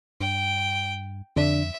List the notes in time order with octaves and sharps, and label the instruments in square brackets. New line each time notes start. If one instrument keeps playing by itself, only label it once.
[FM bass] G2 [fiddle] G5
[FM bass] F2 [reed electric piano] D3 D4 [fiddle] E5